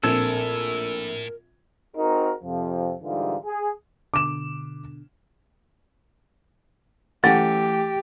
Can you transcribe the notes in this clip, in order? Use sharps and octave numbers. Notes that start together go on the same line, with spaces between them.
A#1 A2 C4 A4 A#4 G#6
C4 D#4 F#4 G#4 A#4
F2 C3 F3
G#2 D3 E3 G3 D#4 F4
G#4
B2 D3 D6 E7
E3 F#3 A3 C#4 G4 F#5 A6